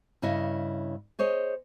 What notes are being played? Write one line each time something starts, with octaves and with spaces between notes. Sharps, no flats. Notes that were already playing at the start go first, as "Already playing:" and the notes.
G2 C#3 E4 C#5 D#5
G#4 C5 C#5 D#5